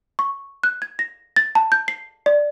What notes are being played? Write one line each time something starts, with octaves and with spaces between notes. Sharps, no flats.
C#6
F#6
G#6
A#6
A6
A5
G6
C7
D5